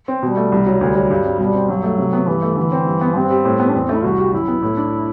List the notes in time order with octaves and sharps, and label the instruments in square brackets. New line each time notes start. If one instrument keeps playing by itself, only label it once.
[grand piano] C4
[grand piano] B2 [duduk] G3
[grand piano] A3
C2
F#3
[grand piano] D2 [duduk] G3
[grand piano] F#3
G2
C4
[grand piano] B2 [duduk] G3
[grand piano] C4
[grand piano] G2 [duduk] F#3
[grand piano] A3
C3
B3
[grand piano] G2 [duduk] E3
[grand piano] A3
[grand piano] D3 [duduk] E3
[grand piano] C4
G2
B3
[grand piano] G2 [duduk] C4
[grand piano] G3
A2
B3
[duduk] D4
[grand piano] E2 [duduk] C4
[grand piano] A3
[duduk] E4
[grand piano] C2 [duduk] F#4
[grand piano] G3
[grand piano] F#2 [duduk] E4
[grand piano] B3
A2
D4